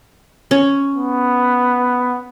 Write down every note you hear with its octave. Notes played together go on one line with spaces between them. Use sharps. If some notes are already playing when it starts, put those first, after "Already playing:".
C#4
B3